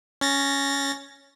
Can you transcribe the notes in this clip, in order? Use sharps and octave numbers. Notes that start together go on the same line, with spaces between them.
C#4 A6 A#6